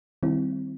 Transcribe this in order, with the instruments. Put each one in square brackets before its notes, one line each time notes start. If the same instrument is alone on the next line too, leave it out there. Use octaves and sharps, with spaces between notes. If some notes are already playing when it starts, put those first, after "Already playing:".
[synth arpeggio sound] D#3 G3 C4 E4